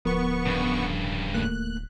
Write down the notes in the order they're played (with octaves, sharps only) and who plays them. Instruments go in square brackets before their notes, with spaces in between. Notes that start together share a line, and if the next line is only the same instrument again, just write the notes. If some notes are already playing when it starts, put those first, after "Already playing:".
[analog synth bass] D1 [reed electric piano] F3 A#4 [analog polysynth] B3 C#6
[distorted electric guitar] G2 C#3
[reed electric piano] D#2 A3 A#3 [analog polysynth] F#6